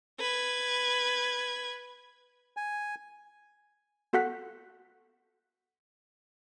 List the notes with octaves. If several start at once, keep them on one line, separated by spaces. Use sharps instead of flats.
B4 G#6
G#5
B3 F#4 A4 F#5 F#6 B6